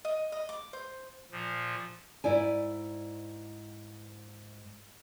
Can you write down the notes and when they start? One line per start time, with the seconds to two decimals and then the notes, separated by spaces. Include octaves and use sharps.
0.05 D#5
0.32 D#5
0.49 D6
0.73 C5
1.31 A#2 F3
2.24 G#2 E4 D5 G#5